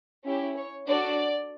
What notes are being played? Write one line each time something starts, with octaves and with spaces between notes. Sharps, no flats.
C#4 E4 G4
C#5
D4 F#4 A4 D5